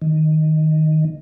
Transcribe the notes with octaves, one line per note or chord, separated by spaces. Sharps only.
D#3